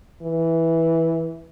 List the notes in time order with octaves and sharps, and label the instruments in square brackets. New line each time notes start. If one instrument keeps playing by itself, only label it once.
[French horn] E3